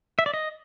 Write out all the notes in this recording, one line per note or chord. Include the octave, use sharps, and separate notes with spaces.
E5
D5
D#5